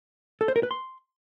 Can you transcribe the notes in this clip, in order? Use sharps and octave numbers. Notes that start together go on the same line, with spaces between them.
A4
C5
A#4
B4
C6